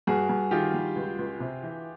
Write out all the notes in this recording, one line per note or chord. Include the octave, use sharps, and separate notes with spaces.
G2 F#4 G#4
G2
D#3 F4 G4
G3
C#2
C#2
C3
E3